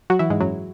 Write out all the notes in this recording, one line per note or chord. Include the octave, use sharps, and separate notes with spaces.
F#3 F#4
E3 E4
G#2 G#3
F#2 F#3